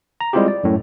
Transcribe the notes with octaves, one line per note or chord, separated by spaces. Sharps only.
A#5
G3 G#3 C4 E4 F4 G4
D5
F#2 A2